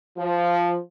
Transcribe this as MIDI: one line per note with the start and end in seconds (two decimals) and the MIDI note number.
0.18 0.76 53